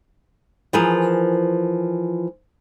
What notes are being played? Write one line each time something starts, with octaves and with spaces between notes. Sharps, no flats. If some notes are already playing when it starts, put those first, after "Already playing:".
E3 F3 G#4 A#4